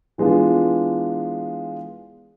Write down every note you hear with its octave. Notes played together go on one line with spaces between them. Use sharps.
E3 G#3 B3 D4 F4